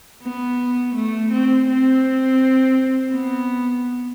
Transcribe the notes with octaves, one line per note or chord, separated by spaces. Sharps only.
B3
A3
C4
C4
B3